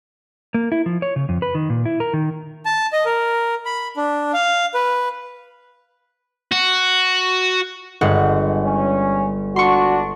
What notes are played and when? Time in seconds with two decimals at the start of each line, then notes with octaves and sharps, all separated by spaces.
0.54 A#3
0.72 E4
0.86 F3
1.02 C#5
1.16 C#3
1.29 F2
1.42 B4
1.55 D#3
1.70 A#2
1.85 E4
2.00 A#4
2.14 D#3
2.65 A5
2.93 D#5
3.06 A#4
3.65 B5
3.97 D4
4.33 F5
4.74 B4
6.52 F#4
8.01 G1 G#3 F#5
8.65 C#4
9.56 D4 F#4 C6 C#6